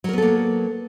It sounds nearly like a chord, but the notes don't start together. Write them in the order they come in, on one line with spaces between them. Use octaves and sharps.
F#3 A#4 B3 A4 A#3